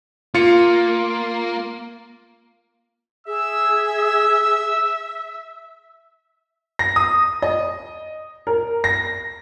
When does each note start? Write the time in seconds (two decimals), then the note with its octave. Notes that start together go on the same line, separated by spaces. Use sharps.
0.35 A#3 F4 C#7
3.27 G#4 E5 E6
6.79 A#6
6.96 D#6
7.42 D#5
8.47 A#4
8.84 A#6